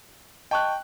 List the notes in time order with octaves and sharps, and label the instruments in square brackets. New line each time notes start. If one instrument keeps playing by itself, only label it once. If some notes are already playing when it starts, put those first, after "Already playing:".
[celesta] D#5 A5 C#6 [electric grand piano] G5 F#6